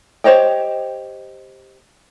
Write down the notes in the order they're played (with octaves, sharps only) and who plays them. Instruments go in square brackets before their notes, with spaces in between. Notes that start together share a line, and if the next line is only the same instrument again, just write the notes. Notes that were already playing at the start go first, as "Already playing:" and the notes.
[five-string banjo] G4 C5 C#5 D#5 G5